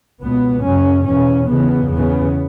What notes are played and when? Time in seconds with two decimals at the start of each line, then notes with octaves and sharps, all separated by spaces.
0.22 C#2 B2 B3
0.64 F#2 C#3 C#4
1.06 E2 B2 C#4
1.49 E2 C#3 B3
1.90 E2 C#3 B3